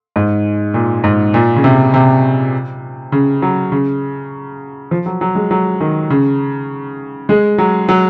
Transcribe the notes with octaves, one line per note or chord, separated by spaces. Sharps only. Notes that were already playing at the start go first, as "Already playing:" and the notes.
G#2
A#2
G#2
A#2
C#3
C3
C3
C#3
F#3
C#3
F3
F#3
F#3
G#3
F#3
D#3
C#3
G#3
F#3
F#3